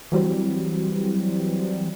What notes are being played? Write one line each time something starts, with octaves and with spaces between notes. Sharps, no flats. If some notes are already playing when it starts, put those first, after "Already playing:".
E3 F#3 G3 C4